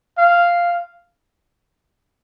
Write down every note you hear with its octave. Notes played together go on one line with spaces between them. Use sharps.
F5